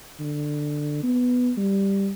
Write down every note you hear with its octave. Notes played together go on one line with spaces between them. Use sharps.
D3
B3
G3